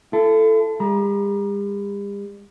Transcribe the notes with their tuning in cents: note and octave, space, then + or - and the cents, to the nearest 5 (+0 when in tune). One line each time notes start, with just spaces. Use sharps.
E4 +45 A4 +0
G3 +45 A#5 +35